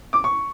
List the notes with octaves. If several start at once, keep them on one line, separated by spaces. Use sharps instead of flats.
D6
C#6